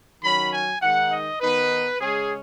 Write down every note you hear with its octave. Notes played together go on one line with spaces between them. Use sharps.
D#3 F#3 C#4 B5
G#5
D#3 G#3 D#4 F#5
D#5
D#3 B3 D#4 B4
C#3 G#3 C#4 G#4